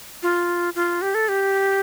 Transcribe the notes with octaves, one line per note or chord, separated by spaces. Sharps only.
F4
F4
G4
A4
G4